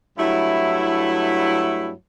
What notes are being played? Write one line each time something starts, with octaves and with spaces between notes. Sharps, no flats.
G2 F#3 A3 E4